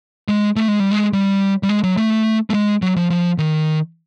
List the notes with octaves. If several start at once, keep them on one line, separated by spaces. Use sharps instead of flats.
G#3
A3
G#3
G3
G#3
G3
G3
G#3
F#3
A3
A3
G#3
F#3
F3
F3
D#3